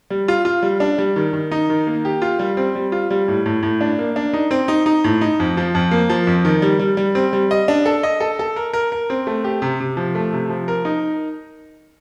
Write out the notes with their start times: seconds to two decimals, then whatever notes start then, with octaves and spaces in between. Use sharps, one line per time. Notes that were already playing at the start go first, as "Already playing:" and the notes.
0.10 G3
0.28 F4
0.45 F4
0.63 G3
0.80 D4
0.98 G3
1.16 D#3
1.33 D#3
1.52 D#4
1.70 D#3
1.87 A#3
2.05 G4
2.22 F4
2.39 G3
2.57 C4
2.75 G3
2.92 F4
3.11 G3
3.28 A2
3.46 A2
3.63 A2
3.81 D4
3.99 A#3
4.16 D4
4.33 D#4
4.51 C4
4.68 D#4
4.86 D#4
5.04 A2
5.21 D#4
5.40 F2
5.57 F3
5.75 F2
5.91 A#3
6.10 F3
6.27 F2
6.45 D#3
6.62 G3
6.79 G3
6.97 G3
7.15 C4
7.33 G3
7.51 D#5
7.68 D4
7.86 A4
8.03 D#5
8.20 A4
8.39 A4
8.56 A#4
8.73 A#4
8.92 A#4
9.10 C4
9.27 A3
9.44 G4
9.62 C3
9.80 C3
9.97 F3
10.15 A3
10.33 C3
10.50 F3
10.68 A#4
10.85 D#4